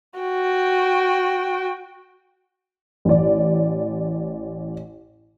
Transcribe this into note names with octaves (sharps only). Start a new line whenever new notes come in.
F#4 G5
A1 D5